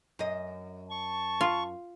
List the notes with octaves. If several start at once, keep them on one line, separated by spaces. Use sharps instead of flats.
F#2 D#5
A5 C#6
F4